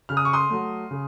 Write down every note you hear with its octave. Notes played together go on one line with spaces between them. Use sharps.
C#3 F6
D#6
C#6
C6 D#6
F#3 A3
C#3